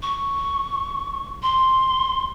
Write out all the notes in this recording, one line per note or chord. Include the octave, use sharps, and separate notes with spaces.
C#6
C6